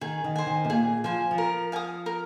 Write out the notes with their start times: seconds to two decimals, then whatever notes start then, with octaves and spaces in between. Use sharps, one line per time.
0.01 D#3 G#4
0.24 D#3
0.36 C5 G#5
0.47 D#3
0.65 C3
0.70 A#2 G#4
1.04 F3 C5 G#5
1.31 F3
1.38 A#4
1.72 F5 G#5
1.76 D#6
2.06 A#4